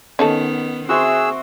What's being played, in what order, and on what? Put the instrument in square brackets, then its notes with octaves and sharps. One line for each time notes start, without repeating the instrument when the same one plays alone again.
[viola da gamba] D#3 B3 [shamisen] C#4 D#4 A4 [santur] F#5
[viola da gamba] C4 [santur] F#4 E5 C6 [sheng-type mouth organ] G#4 E6